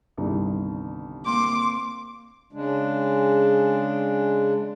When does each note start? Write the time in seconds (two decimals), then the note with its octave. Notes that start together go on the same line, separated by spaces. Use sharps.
0.17 G1 C2 D#3
1.26 A#3 C4 C6 D6
2.53 C#3 G#3 D4